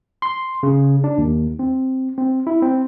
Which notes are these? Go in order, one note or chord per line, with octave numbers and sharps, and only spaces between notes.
C6
C#3
D4
D#2
C4
C4
E4
C4